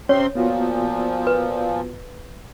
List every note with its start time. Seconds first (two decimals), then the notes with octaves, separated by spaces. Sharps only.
0.09 C3 C4 C#4 C#5 C6
0.35 A#2 F3 B3 F4 F#4
1.27 B4